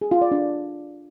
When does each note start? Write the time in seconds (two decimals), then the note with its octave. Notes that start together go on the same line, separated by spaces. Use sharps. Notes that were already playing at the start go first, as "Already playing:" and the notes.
0.01 G#4
0.11 F4
0.21 D5
0.31 D4